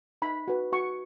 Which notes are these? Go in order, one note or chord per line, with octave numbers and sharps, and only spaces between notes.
D#4 B5
F#4 B4
F#4 C#6